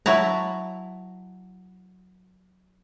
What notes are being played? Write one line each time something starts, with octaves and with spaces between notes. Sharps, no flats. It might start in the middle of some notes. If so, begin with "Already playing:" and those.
F#3 E4 A5 A#5